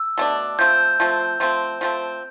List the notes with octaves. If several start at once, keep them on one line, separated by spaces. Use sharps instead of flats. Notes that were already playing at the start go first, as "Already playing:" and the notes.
Already playing: E6
B2 A3 D4
F3 A3 C4 G6
F3 A3 C4
F3 A3 C4
F3 A3 C4